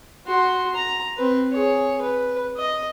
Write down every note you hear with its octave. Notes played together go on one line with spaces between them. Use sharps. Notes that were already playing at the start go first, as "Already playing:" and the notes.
F#4 C6
A#5
C4 B4
G#4 C#5
B4
D#5